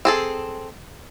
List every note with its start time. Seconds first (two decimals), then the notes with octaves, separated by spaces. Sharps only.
0.05 C4 G#4 A4